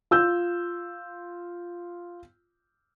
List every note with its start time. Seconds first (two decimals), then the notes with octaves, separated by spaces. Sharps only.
0.11 F4 E6 G6